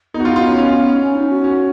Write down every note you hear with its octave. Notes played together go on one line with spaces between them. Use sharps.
B3 D#4
F#4
F4
F4
C#4
C#4
C#4
D#4
F#4
C#4